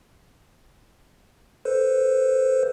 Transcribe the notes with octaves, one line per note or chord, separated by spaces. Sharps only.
A4 B4 C5